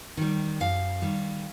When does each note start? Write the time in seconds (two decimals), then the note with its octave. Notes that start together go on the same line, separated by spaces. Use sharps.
0.17 D#3 G3
0.60 F#2 F5
1.02 D#3 G3